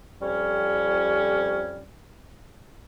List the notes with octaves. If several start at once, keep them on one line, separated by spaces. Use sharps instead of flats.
F2 G3 C#4